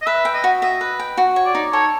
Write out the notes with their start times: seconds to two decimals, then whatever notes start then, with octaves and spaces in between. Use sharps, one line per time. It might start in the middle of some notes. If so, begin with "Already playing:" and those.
0.02 D#5
0.07 B4 E5
0.25 G5
0.34 D#5
0.44 F#4
0.62 D#5 E5
0.81 B4
0.99 G5
1.18 F#4
1.36 C#5
1.45 D5
1.55 D#4
1.73 A4 C#5